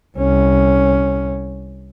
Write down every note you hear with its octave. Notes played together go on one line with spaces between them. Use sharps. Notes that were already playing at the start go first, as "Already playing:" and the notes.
C2 C#4